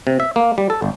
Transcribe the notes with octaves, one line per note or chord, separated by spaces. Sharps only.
C3
E5
A#3
G3
A4
G1